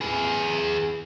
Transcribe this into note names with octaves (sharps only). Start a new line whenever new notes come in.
G#4 B4